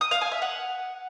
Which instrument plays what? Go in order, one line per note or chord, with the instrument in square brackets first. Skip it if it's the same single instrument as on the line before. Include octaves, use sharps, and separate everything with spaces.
[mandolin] D#6
F5
G#5
E5
F#5